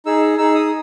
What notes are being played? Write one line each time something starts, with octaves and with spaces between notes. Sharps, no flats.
D#4 G#4 E6
D#4 G#4 E6
D#6